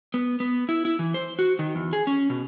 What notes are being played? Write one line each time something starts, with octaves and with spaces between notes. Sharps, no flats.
B3
B3
E4
E4
E3
C5
F#4
D#3
E2
G#4
C#4
B2